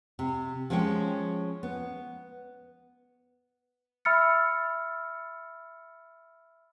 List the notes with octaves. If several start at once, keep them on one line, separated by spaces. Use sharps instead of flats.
C3
F3 G#3 C#4 C#5 G5
B3
E5 B5 E6 F6 A6 C#7